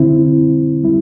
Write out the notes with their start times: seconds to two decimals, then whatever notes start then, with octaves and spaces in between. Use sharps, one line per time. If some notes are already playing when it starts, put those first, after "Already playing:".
Already playing: D3 C4 E4
0.84 G3 E4